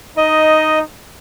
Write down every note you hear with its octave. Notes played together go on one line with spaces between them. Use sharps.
D#4 D#5